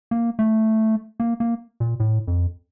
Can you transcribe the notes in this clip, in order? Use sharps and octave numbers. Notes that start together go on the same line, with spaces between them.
A#3
A3
A#3
A#3
A#2
A2
F2